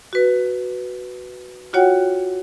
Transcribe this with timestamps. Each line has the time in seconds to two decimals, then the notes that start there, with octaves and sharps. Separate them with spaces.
0.13 F#4 B4
1.73 F4 F#4 C#5 F#5 G5